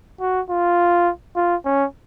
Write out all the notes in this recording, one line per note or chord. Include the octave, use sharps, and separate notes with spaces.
F#4
F4
F4
C#4